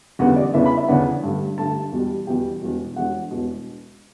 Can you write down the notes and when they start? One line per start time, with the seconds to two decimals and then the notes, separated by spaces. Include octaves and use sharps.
0.19 F#1 E2 D3 G3 B3 F#5
0.36 D5
0.54 E2 C#3 E3 B3 D4 E5
0.66 B5
0.77 E5
0.88 E2 C#3 E3 B3 D4 F#5
1.23 G2 D3 A3
1.58 G2 D3 A3 A5
1.92 E2 B2 G3
2.27 E2 B2 G3 G5
2.61 E1 E2 B2
2.96 E1 E2 B2 F#5
3.31 E1 E2 B2